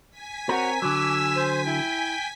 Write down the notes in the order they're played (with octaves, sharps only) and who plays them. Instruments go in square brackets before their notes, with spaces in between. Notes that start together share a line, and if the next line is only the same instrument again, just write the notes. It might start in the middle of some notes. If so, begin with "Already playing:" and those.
[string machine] G#5 B6
[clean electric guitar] C4 A#4 [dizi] F#4 [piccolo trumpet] C#5
[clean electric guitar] D3 F#3 [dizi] D6 [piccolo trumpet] E6
[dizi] C5
[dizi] E4 [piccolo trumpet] G5